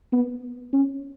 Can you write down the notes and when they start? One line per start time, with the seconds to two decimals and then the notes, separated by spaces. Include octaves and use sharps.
0.12 B3
0.73 C#4